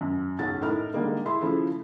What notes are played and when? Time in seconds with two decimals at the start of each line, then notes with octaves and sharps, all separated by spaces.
0.01 F#2
0.39 B1 F#2 C#3 C#4 F#5 A6
0.62 A2 D#4 E4 A#4 F6
0.93 D3 G3 G#3 A#3 D#4
1.25 E4 G#4 E5 C6
1.41 C#3 F3 A3 E4 F4